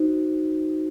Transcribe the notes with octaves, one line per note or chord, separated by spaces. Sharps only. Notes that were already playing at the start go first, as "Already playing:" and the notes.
Already playing: D#4 F#4 C5